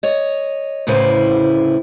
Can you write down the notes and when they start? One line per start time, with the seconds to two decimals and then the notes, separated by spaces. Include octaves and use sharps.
0.03 C#5 D#5
0.87 D2 A2 C#3 E4 B4 C5